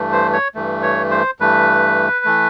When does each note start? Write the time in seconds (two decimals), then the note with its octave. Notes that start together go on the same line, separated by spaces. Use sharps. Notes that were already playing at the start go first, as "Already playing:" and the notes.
Already playing: G2 E3 A3
0.13 C5
0.33 C#5
0.55 G2 E3 A3
0.83 C#5
1.11 C5
1.40 G2 E3 A3 B4
2.25 E3 A3